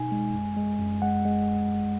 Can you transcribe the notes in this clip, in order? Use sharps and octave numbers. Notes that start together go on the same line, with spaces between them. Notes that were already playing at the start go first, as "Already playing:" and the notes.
Already playing: B2 D#4 G#5
G#3
F#2
G#3
F#2
G#3 F#5
G#3